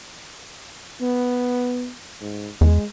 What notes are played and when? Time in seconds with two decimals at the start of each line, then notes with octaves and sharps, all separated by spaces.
1.01 B3
2.21 G#2
2.61 E2 G#3